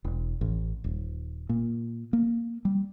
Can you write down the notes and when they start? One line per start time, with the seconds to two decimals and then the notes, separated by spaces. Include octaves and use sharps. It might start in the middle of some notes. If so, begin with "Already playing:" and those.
0.05 E1
0.41 A1
0.84 D#1
1.49 A#2
2.13 A#3
2.65 G3